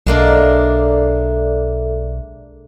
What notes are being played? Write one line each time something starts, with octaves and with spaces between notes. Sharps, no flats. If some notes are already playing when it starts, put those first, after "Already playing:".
B1 G#3 A#3 D4 A4 D5 E5